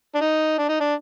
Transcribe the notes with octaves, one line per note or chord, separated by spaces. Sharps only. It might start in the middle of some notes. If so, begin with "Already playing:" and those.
D4
D#4
D4
D#4
D4